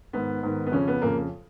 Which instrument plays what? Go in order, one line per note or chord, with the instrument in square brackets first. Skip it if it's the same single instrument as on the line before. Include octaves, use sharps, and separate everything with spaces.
[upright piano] G#2 D#3 B3
G#2 D#3
B3
F2 C#3 C#4
B3
F2 C#3 A#3